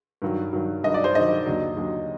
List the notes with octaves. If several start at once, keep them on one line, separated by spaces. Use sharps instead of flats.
G2 D#3 F#3
G2 D#3 F#3
G2 D#3 F#3 D#5
D5
C5
G2 D#3 F#3 D#5
D#2 D3 F#3
D#2 D3 F#3